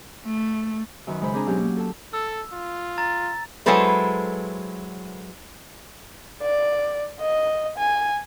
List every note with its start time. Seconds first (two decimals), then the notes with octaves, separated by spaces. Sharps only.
0.25 A3
1.07 F#2 D#3 B4
1.21 C#3 G#3 A#4 C5 B5
1.33 C4 D4 G#4 A#4 G#5 A#5
1.46 G#2 B2 F#3 C#4 G4
1.59 A#3
1.77 A4 A5
2.13 A4 E6
2.53 F4
2.98 A#5 A6
3.66 F#3 G#3 E4 A4 B4 C5
6.42 D5
7.21 D#5
7.78 G#5